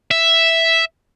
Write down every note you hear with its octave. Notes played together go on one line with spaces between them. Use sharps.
E5